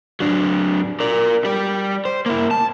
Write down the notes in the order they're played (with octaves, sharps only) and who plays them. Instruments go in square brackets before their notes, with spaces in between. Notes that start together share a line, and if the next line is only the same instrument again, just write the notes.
[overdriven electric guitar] F#3 D4
A#4 D5
G3 D5
C5
A#3 E4
A5